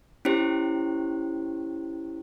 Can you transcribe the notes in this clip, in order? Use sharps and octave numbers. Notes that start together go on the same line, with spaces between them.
C#4 E4 G4 C5